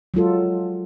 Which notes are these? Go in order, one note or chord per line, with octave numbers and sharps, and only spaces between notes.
F#3 G#3 F4 A4